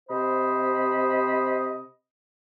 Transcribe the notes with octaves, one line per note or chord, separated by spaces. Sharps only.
C3 C5 D#5 B5